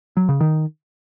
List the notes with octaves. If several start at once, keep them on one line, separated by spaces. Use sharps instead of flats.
F#3
C#3
D#3